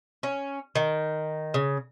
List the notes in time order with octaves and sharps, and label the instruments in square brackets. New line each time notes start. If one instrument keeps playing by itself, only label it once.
[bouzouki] C#4
D#3
C#3